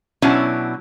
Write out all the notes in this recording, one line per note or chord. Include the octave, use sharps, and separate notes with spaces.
B2 F#3 C#4 D4 E4